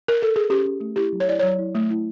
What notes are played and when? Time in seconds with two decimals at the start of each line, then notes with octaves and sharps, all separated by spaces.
0.08 A#4
0.22 A4
0.36 G#4
0.50 C#4 G4
0.66 C#4
0.80 A3
0.96 E4 G4
1.13 F#3
1.20 C#5
1.28 E4 D5
1.40 F#3 C#5
1.59 E4
1.75 A3
1.90 E4